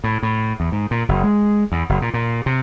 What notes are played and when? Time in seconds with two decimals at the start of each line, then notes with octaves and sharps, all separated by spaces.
0.04 A2
0.23 A2
0.60 E2
0.72 G#2
0.91 A#2
1.09 F#1
1.23 G#3
1.72 E2
1.89 F#1
2.02 A#2
2.14 A#2
2.46 C3